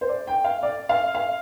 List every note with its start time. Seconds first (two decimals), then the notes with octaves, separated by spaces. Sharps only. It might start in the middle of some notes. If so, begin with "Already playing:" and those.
0.01 C5
0.09 D5
0.27 G5
0.44 F5
0.63 D5
0.89 F5
1.15 F5